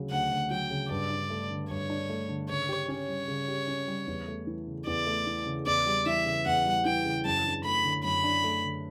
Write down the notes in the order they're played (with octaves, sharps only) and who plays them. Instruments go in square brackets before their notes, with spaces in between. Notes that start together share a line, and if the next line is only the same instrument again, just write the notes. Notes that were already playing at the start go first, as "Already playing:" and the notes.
Already playing: [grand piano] D2 C#3 F#3
[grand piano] D2 [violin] F#5
[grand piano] D2
[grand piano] F#3 [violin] G5
[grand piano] C#3
[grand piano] G2 [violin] D5
[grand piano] D4
A3
D3
[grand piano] G2 [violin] C#5
[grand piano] D4
A3
D3
[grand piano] C#3 [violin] C#5
[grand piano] G4
[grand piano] C#4 [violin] C#5
[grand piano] G3
C#3
G4
C#4
G3
E2
A3
E3
C#3
[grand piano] E2 [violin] D5
[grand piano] A3
E3
C#3
[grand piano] E2 [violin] D5
[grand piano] G3
[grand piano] E3 [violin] E5
[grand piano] C#3
[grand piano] E2 [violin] F#5
[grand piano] G3
[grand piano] E3 [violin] G5
[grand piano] C#3
[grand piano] F#2 [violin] A5
[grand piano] D4
[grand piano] A3 [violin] B5
[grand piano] D3
[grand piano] F#2 [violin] B5
[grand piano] D4
A3
D3